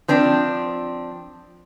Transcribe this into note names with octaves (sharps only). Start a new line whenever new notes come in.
F3 C4 D4